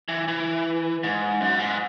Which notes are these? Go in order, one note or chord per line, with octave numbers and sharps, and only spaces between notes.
E3
E3
G#2
F#2
G#2